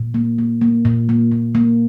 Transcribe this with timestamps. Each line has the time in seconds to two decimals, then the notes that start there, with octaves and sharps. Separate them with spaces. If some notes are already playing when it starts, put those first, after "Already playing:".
Already playing: A#2
0.14 A#3
0.38 A#3
0.61 A#3
0.85 A#2
1.09 A#3
1.32 A#2
1.55 A#3